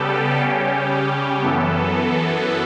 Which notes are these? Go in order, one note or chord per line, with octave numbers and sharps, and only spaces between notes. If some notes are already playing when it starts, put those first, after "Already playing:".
Already playing: C#3 G3 B3 G4 A4
C#3 G3 C#4
F#2 E3 B3 A4